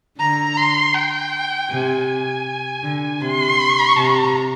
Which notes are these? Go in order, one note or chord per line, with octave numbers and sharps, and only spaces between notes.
D3 A#5
C6
G5
C3 G#5
D3
C3 C6
C3 A#5